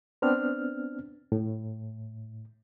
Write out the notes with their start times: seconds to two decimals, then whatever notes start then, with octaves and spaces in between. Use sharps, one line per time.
0.22 B3 C4 D4 F6
1.32 A2